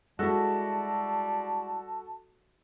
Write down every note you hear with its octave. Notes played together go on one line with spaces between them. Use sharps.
G3 G#3 E4 F#4 A4 A5